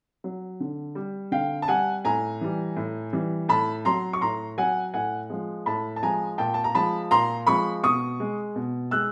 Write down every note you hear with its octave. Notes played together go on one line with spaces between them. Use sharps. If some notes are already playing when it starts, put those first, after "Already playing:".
F#3
D3
G3
D3 F5 G5
A5
G3 F#5 G#5
A2 G#5 A#5
E3 G3
A2
E3 G3
A2 A5 B5
F#3 A#5 C6
C#6
A2 A#5 C6
F#3 F#5 G#5
A2 F#5 G#5
F3 G#3
A2 A5 B5
A5
F3 G#3 G#5 A#5
A#2 G5 A5
A5
A#5
F3 G#3 A5 B5
A#2 A#5 C6
F3 G#3 B5 C#6
B2 C#6 D#6
G#3
B2
G#3 E6 F#6